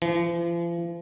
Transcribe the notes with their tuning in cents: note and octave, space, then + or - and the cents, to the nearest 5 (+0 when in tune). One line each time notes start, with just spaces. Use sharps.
F3 -40